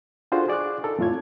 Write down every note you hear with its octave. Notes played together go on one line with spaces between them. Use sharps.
D4 F4 F#4 G#4 A4 C5
G#4 D5 C#6 D6 F#6
D#4 A4 A#4
F2 A2 F3 F4 C#5 G#6